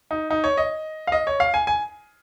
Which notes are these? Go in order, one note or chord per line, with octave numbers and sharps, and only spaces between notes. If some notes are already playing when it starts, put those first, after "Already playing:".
D#4
D#4
C#5
D#5
F5
D#5
C#5
F5
G#5
G#5